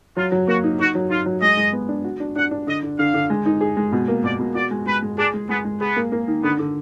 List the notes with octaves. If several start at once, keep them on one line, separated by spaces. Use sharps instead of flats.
F#3 F4
F#3
A#3 F#4
D#4
D#4 F#4
F#3
D#4 F4
F#3
G#3 D#5
G#3
B3
D4
F#4
D4
D4 F#5
D4
D3 D#5
D3
D3 F5
D3
G#3
D#4
G#4
G#3
B2
A#3
B2 D5
B2
F#4 D5
G#3
G#3 B4
G#3
D4 G#4
G#3
G#3 B3
G#3
B3 G#4
A#3
A#3
D#3
D3 B3
D3